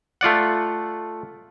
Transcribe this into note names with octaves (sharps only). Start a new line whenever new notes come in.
A3 F4 D5 F#5